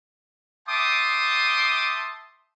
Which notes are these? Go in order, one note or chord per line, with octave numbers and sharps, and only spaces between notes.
E5 G5 A5 C6 D6 D#6